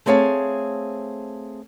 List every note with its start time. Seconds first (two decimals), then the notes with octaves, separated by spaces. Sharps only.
0.06 A3 C4 G#4 C#5 F5 A5